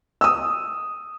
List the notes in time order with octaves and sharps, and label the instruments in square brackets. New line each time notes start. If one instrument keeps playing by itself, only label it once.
[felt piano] D#6 E6